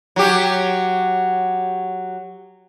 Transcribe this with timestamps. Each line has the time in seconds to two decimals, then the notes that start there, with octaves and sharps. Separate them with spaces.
0.16 F#3 G4